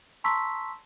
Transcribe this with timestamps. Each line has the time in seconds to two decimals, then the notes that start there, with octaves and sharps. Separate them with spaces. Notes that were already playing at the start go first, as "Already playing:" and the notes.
0.24 A5 A#5 C6 C#6 E6 B6